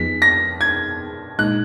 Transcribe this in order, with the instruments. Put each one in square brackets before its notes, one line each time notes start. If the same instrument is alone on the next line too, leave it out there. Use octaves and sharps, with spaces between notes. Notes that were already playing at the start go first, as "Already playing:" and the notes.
Already playing: [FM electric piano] F2 F3 B3 D#4 G#4 [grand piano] B6
[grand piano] A#6
G#6
[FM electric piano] A#2 G#3 D#4 [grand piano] F#6